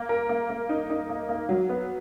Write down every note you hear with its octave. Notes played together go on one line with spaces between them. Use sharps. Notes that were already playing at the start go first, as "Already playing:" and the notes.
Already playing: A#3
A#4
A#3
A#3
D#4
D#4
A#3
A#3
F#3
B3